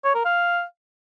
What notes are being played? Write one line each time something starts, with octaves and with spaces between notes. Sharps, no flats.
C#5
A#4
F5